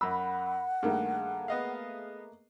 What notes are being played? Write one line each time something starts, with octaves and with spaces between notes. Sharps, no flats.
F#2 F#5 B5 E6
G2 D#3 A3 A#3 G#4
B3 D#5 F5